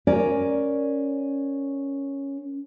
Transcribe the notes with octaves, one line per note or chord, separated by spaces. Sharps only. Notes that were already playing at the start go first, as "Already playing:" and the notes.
C#4 A#4 D5